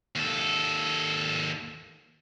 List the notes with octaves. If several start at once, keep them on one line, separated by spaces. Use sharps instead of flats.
D#2 A4